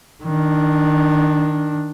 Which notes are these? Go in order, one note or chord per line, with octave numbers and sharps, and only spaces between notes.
D#3 D4